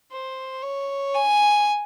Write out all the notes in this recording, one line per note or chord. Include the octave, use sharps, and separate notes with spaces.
C5
C#5
G#5